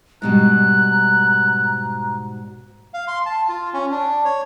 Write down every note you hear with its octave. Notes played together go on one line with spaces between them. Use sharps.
G#2 B2 G3 A#5 F#6
F5
C6
A5
F4
C#4
D4
C#5